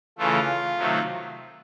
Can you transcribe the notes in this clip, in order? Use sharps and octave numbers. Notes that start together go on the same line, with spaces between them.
C#3 E3 A3 F4
C3 D#3 F#3 A3